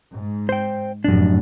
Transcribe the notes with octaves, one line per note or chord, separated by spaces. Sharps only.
G#2
C5 G5
F1 F#2 A2 D4